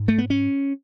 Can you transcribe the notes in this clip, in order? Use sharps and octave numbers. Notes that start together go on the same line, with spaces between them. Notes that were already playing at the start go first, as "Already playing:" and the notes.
Already playing: G#2
A3
B3
C#4